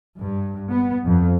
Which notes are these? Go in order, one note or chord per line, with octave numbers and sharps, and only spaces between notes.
G2
B3
F2